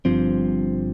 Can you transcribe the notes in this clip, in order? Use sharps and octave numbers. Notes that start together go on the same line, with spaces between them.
G1 G2 F3 C4